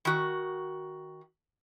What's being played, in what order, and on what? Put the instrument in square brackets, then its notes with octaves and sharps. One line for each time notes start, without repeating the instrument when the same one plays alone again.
[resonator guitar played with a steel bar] D#3 F#4